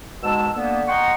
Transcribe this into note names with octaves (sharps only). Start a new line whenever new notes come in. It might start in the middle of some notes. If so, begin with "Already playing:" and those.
G#2 B2 G#3 A5 E6
D3 A#3 B3
D#5 F#5 G5 A#5 C6 C#6